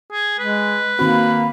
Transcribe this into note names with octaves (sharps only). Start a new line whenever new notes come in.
G#4
G#3 B4
D#3 A#3 C4 F#4 B5